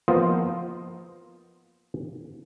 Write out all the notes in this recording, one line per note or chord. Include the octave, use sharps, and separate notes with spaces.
F3 A#3 B3 F4 C5 D#5